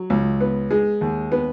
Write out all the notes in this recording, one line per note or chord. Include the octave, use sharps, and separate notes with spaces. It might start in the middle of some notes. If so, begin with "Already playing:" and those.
Already playing: F#3
C#2
B3
G#3
D#2
B3